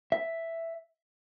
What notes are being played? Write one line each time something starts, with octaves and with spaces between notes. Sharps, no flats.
E5